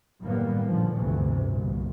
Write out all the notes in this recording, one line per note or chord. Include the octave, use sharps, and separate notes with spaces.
F#1 A2 D#3 G3 A#3 B3
A#2 D3 F3
G1 D2 A2 C3 E3
G1 C2 A#2